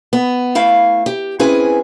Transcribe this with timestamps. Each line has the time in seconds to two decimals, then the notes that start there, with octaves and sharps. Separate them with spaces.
0.13 B3
0.55 A3 E4 F5
1.06 G4
1.39 C4 C#4 E4 G#4 B4 G#5